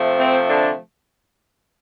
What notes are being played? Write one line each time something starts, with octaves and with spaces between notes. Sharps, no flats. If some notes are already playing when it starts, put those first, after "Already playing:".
Already playing: C3 F3 A3
C4
D3 D4